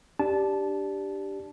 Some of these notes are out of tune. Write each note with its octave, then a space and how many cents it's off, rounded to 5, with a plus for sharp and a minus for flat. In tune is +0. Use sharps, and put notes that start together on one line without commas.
D4 +0 G4 +0 A5 -15